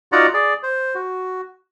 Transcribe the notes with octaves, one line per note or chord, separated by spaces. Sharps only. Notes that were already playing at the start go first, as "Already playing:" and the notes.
D#4 F4 F#4 D5 F#5 A#5
G#4 D5
C5
F#4